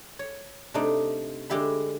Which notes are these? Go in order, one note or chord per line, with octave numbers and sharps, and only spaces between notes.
C#5
C3 A3 D4 D#4
D3 G#3 G4 E5 B5